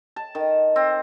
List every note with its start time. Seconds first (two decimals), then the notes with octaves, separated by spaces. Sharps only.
0.16 A5
0.35 D#3
0.76 C4